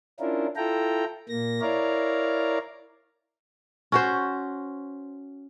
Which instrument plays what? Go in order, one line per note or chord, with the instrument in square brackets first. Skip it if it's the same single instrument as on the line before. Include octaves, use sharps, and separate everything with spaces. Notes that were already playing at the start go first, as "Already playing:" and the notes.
[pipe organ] C#4 D4 E4 F4 A#4
E4 F4 A4 G5 A#5
A#2 A#3 A#6
E4 A#4 C#5 D5 F5 A#5
[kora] C#4 F#4 C5